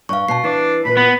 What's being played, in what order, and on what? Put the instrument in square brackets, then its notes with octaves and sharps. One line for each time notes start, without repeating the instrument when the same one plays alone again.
[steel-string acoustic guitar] G2 [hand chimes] F5 C#6
[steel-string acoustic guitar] B2 [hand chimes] A5 C7
[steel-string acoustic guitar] E3 [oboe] D4
[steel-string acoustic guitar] A#2 E3 B4 [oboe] B5
[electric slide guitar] B3 [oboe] B5